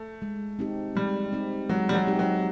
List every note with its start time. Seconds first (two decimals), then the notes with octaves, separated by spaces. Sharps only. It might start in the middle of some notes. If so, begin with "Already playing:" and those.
Already playing: A3
0.22 G#3
0.59 C4 D#4 G4
0.95 G3 G#3
1.33 C4 D#4 G4
1.69 F#3 G#3
1.89 G3
1.94 F#3
2.07 C4 D#4 G4
2.19 F#3